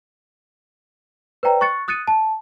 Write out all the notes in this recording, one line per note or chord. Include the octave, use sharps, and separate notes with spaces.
B4 C5 D5 G5 A#5
C#6 F#6 A6 C#7
D#6 F#6 A6 C#7 D#7
A5